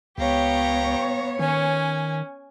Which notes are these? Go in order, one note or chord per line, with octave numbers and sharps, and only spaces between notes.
C#2 B3 G4 C#5 F5 A#5
D#3 C#4 G#5